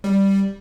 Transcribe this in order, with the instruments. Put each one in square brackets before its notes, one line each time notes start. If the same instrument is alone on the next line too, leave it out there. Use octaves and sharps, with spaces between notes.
[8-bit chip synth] G3